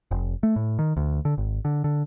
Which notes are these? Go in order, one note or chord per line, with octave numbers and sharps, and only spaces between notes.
F1
A3
A2
D#3
D2
D3
G#1
D3
D3